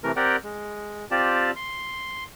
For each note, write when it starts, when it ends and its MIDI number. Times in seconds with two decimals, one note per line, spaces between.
0.04 0.12 48
0.04 0.12 52
0.04 0.12 57
0.04 0.12 70
0.16 0.36 60
0.16 0.36 67
0.16 0.36 70
0.16 0.36 74
0.16 0.36 78
0.16 0.36 79
0.44 1.05 56
1.11 1.51 60
1.11 1.51 65
1.11 1.51 67
1.11 1.51 74
1.11 1.51 81
1.56 2.24 84